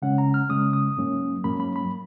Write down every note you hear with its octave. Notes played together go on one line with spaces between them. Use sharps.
C#3 G#3 C#4 F#5
A#5
F6
C#3 G#3 C#4 D#6
D#6
G#2 F#3 A#3 C#4
G#2 F#3 A#3 C#4 B5
B5
B5